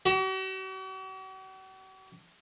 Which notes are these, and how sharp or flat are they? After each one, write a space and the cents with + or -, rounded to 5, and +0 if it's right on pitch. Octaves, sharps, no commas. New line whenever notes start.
F#4 +45